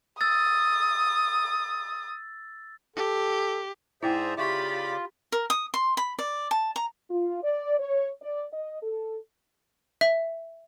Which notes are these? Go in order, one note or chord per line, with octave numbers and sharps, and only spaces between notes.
D#6 E6 A6
G4 A4
G#2 E4 G#4 C5 D5 E5 G5 A#5
C#3 F4 G4 D5 E5 B5 C#6 D6
A#4
D#6
C6
B5
D5
A5
A#5
F4
D5
C#5
D5
D#5
A4
E5